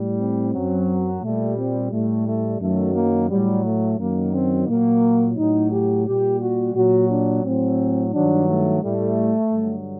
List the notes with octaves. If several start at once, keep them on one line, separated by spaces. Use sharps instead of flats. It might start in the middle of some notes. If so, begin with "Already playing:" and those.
Already playing: A2 G3
C4
F#2 F#3
A#2 G3 A3
C4
A2 G3 A3
A3
F#2 D#3 F#3 A3
A#3
A2 F#3 G3
A3
F#2 D#3 F#3 A#3
C4
A#2 F#3 A#3
A2 F#3 D#4
G4
A#2 G3 G4
F#4
A#2 F#3 F#4
D4
A2 F#3 C4
G2 D#3 F#3 D4
A3
A2 G3 A3
G2 D3 F#3